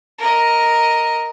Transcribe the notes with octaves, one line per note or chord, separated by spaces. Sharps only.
A#4 D#5